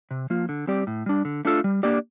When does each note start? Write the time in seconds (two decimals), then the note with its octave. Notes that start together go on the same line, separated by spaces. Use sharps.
0.11 C3
0.30 F3 A#3 F4
0.49 D3
0.67 G3 C4 G4 D5
0.87 A2
1.06 G3 D4
1.25 D3
1.45 A3 D4 F4 A4
1.64 G3
1.83 A#3 D4 G4 D5